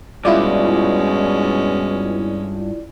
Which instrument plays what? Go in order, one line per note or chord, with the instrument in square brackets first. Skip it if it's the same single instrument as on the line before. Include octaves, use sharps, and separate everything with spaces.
[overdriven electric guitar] G2 [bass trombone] B2 [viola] G#3 C#4 [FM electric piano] E4 F4 D5